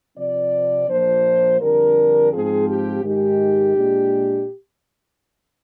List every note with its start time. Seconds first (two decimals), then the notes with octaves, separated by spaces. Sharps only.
0.17 C3 F3 C4 D5
0.89 A#2 F3 A#3 D4 C5
1.60 F2 D3 G3 D4 A#4
2.33 G#2 F3 C4 G#4
2.67 G4
3.04 G#2 D#3 G#3 G4
3.76 A#2 G#3 D4